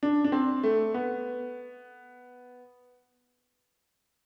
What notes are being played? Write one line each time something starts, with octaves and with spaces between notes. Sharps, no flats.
D4
D4
C4
A3
B3